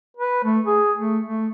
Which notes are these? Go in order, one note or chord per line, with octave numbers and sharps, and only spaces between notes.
B4
A3
G#4
A3
A3